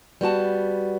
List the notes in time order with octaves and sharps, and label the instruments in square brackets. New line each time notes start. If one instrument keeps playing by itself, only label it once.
[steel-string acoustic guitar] G3 B3 F#4 A5